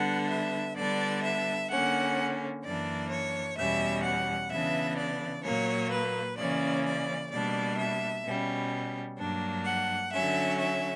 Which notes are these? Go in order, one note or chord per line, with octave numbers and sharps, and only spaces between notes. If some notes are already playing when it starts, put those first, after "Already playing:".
Already playing: D3 G3 B3 D4 F#5
E5
D3 G3 B3 D4 D5
E5
D3 A#3 C#4 F#5
F#2 E3 A#3 D4 D5
C#5
E2 B2 G3 C#4 E5
F#5
C#3 E3 B3 D4 E5
D5
A#2 F#3 A#3 C#5
B4
C#3 E3 A#3 C#4 D5
D5
B2 G3 A#3 D4 D5
E5
B2 G3 C#4
G2 F#3 A#3 D4
F#5
D3 F#3 C#4 E5
E5